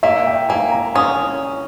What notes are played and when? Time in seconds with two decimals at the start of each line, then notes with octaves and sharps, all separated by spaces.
0.03 A#3 E5
0.27 G5
0.49 A#3 G#5
0.72 A#5
0.95 C#4 D#6